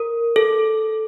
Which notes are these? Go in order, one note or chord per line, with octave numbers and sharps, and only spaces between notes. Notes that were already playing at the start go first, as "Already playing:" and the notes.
Already playing: A#4
A4